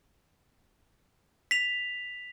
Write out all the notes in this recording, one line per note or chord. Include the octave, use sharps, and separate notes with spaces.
B6 F7